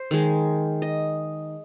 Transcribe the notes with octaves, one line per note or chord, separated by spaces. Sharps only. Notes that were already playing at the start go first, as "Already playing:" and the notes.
Already playing: C5
D#3 G#3
D#5